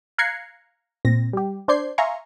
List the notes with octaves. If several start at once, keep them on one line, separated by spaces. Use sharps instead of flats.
F5 A#5 F#6 G#6 C7 C#7
A#2 C4 A#6
G3 G4
D4 C5 D5 G6 G#6 C7
E5 F5 G#5 A#5 C6 C#6